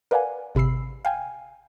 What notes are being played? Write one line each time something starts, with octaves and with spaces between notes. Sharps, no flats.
A#4 B4 D5 F5 F#5 G#5
G#1 C3 B5 E6 C7
F5 G5 G#5